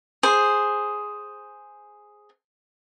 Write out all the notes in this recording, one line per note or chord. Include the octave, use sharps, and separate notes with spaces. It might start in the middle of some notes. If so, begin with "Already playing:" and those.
G#4 C5